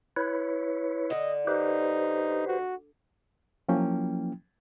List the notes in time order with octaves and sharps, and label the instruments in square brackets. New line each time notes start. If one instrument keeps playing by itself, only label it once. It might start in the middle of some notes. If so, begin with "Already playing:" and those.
[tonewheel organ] E4 B4 C#5
[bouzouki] D3 [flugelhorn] D#5
[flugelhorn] D#4 [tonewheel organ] G4 B4 C5
[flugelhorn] F#4
[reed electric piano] F3 F#3 A#3 C#4 E4 G5